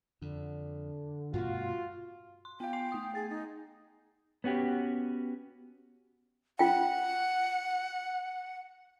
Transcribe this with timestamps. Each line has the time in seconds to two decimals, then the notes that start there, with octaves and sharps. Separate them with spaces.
0.22 F2 D3
1.33 G2 B2 A3 F4 F#4
2.45 C6
2.60 B3 F5 G5
2.73 G#5 C6 C7
2.92 A3 D#6
3.15 G#4 A6
3.30 D#4
4.44 B3 C#4 F#4 G4
6.59 F4 F#5 G5